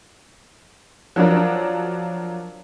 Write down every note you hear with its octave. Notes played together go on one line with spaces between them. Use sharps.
F3 F#3 D4 A#4